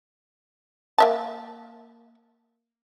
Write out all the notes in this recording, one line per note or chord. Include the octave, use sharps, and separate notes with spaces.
A#3 E5 A5